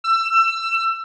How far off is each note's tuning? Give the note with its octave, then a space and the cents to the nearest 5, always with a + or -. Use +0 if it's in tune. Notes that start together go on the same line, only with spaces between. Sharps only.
E6 +25